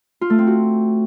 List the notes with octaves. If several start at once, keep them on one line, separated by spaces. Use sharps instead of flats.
F4
A3
C4
F#4